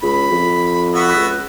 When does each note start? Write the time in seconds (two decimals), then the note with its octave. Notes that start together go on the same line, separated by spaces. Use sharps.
0.02 C#2 B5
0.31 F2
0.94 B3 F#4 E5
1.16 C#2